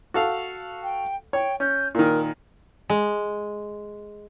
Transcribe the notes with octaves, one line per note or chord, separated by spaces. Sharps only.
F#4 A4 F5
G5
C#5 G5
C#4 G6
A#2 D#3 A#4
G#3